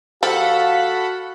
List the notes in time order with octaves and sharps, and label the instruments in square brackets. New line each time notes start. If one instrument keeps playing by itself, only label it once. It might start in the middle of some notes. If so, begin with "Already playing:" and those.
[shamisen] F3 G4 [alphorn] F#4 [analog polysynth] A4 F#5 B5 [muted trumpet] F5